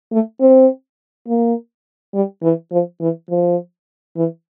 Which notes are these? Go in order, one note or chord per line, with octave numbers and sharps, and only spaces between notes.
A3
C4
A#3
G3
E3
F3
E3
F3
E3